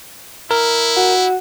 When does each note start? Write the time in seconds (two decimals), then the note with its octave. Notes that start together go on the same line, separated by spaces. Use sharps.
0.51 E4 A#4
0.96 F#4